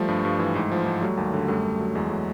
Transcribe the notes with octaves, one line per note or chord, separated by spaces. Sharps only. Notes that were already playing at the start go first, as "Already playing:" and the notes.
Already playing: F3 G3 A3
G2
G2
E3
G#2
F3
G#2
F#3 G3 A3
D#2
D3
F#2 G3 A3
F#2
F#3
E2 G#3
F#3 A3